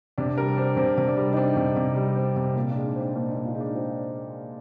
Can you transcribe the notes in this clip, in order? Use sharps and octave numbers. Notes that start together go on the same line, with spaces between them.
C3 D4
G3 A#4
C4 D4
C3 C4
C3
D4
G3
D#4
C4 D4
C3
C3
G3
C4
C3
A#2 F4
D4
G#3
D#4
C4 D4
A#2 D4
A#2 D#4
F4
G#3 D#4
D4
C4 F4